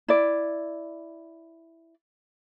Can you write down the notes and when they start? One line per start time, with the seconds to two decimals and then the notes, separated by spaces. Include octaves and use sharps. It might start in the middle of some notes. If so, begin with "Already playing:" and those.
0.08 E4 D5